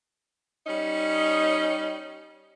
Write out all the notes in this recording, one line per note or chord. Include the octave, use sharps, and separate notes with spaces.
G3 C#4 D#4